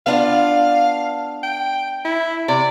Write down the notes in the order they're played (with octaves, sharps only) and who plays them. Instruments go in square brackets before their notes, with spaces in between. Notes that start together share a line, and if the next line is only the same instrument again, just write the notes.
[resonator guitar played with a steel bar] B3 D4 F4 [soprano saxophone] F5
[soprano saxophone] G5
E4
[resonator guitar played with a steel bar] C3 [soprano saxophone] D5